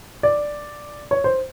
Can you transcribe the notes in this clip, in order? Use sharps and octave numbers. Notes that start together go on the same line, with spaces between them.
D5
C#5
C5